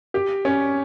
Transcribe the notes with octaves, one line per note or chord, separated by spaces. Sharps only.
G4
C#4